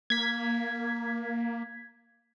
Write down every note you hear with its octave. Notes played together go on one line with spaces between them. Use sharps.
A#3 G#6 B6